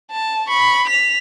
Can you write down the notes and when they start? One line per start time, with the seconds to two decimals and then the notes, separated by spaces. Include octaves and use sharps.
0.11 A5
0.48 B5 C#6
0.88 B6 F7